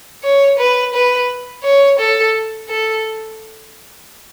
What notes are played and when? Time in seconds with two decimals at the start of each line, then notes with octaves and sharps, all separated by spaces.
0.24 C#5
0.59 B4
0.94 B4
1.64 C#5
1.99 A4
2.69 A4